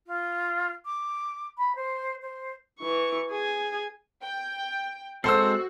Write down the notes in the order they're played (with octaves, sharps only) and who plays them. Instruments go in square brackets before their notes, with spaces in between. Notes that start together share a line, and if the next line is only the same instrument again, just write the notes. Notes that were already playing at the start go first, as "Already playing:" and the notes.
[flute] F4
D6
B5
C5
C5
[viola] E3 C#6
G#4 G#5
[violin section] G5
[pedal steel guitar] G#3 C4 [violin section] F#4 [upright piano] A4 C5 [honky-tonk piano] E6 C7